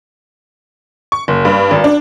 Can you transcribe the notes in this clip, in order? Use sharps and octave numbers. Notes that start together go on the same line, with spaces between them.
C#6
F#1
G2
G#1
D4